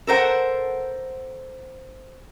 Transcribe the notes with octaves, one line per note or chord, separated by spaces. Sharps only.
A4 A#4 C5 F#5